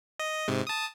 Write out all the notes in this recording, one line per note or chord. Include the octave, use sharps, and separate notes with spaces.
D#5
G#2 C3
A5 D#6